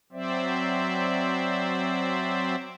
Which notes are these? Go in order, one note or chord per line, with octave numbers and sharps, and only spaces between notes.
F#3 C4 C5 D5 E5